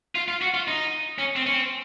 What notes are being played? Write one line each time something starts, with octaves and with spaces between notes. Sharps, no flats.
F4
F4
F#4
F4
D#4
C#4
C4
C#4
C4